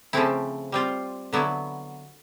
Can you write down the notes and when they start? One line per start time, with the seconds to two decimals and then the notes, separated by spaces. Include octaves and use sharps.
0.13 C#3 F3 A3 C4 E4
0.72 G3 C4 F4
1.33 D3 F#3 B3 E4